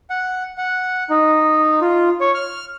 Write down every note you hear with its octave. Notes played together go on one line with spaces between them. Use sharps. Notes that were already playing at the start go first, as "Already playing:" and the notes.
F#5
F#5
D#4
F4
C#5
F6